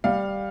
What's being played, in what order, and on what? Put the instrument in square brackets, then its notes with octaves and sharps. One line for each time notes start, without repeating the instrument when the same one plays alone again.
[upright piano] G3 F5